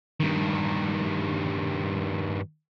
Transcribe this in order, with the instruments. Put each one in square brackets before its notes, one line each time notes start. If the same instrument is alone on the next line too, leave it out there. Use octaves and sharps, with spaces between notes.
[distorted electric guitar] G2 D#3